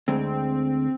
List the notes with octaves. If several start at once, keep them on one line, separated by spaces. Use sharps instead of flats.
D2 G#3 C4